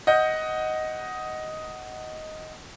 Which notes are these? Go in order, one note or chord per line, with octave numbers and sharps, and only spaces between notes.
D#5 F#5 G6